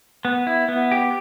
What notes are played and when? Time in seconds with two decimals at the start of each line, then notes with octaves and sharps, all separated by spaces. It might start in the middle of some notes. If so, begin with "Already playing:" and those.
0.25 B3
0.47 E4
0.69 B3
0.92 G4